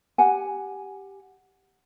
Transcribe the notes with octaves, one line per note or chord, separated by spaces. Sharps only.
G4 F#5 G#5